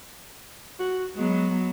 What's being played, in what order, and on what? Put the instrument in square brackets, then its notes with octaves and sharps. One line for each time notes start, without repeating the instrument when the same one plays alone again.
[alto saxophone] F#4
[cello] F#3 B3 [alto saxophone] G#3